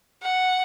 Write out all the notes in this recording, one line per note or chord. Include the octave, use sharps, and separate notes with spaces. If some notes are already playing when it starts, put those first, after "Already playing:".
F#5